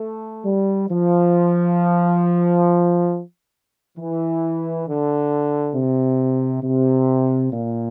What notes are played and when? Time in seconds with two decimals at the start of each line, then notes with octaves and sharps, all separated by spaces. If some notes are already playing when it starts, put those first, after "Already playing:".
Already playing: A3
0.45 G3
0.89 F3
3.98 E3
4.87 D3
5.74 C3
6.63 C3
7.52 A#2